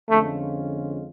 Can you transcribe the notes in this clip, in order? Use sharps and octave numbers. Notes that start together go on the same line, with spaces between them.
F2 D3 G#3 A3 C#4 F4